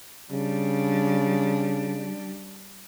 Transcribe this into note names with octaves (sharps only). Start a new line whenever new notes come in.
C#3 G3 D4